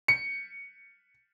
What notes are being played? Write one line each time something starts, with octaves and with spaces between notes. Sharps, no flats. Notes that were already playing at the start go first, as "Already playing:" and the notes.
C#7